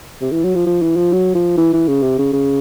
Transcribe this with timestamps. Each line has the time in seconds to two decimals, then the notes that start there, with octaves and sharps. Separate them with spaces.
0.21 C3
0.32 E3
0.44 F#3
0.55 F3
0.66 F3
0.82 E3
0.97 F3
1.12 F#3
1.35 F3
1.57 E3
1.73 E3
1.88 C#3
2.02 C3
2.19 C#3
2.33 C#3